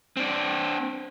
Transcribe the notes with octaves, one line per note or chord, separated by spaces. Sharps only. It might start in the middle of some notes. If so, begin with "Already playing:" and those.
C4 D4